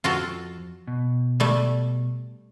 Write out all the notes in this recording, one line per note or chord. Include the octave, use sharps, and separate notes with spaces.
F2 F4 F#4 A4
B2
G3 A3